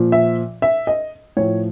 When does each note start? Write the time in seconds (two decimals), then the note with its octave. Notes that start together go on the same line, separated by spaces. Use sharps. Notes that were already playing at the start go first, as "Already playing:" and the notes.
Already playing: A#2 F3
0.12 E5
0.62 E5
0.87 D#5
1.37 A2 F3 C#5